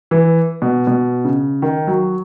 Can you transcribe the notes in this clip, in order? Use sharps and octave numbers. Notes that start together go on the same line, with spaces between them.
E3
B2
B2
C#3
D#3
F#3